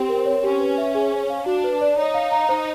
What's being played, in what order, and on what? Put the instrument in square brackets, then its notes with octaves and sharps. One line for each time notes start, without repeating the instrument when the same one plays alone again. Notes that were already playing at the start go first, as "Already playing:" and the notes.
Already playing: [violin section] C4 [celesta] G4
[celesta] A#4
C#5
[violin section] C#4 [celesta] G4
[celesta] B4
E5
G#4
C5
F5
[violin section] D4 [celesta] F#4
[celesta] B4
D5
[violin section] D#4 [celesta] C#5
[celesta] F5
A#5
C5